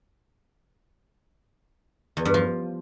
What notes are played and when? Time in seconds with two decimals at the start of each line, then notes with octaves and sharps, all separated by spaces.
2.17 E2
2.25 G2
2.34 F3